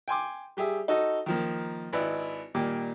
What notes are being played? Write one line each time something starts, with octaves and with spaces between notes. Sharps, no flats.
G5 G#5 C6 D6
G3 G4 G#4 E5
D#4 F#4 A4 D#5
D#3 F3 A#3
G#1 E4 B4 D5 D#5
A#2 D#3 G3 A#3